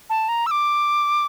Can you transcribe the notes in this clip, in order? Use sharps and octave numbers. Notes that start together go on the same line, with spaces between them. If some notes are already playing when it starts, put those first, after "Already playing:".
A5
A#5
E6
D6